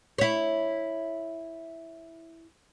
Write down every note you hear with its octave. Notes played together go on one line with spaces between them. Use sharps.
E4 C#5